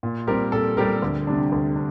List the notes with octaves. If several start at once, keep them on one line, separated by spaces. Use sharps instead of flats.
A#2
G3 C4 G4 A#4
A#2 A4
G3 C4 G4 A#4
D2
C3 G3 D4
D2
D4